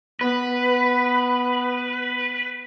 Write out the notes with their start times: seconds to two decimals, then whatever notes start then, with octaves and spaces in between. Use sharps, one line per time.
0.21 B3 B4